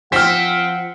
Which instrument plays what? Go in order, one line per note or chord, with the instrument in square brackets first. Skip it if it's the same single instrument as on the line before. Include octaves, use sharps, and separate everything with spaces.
[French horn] F3 [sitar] C4 [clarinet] F#5 [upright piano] F6 B6